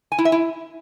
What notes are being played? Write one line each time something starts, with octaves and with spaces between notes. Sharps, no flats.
G#5
E4
E5
E4